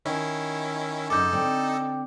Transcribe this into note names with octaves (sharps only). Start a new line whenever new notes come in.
D#3 C#4 E4
F#2 C#3 D#4 A4 D6 G6
D3 C4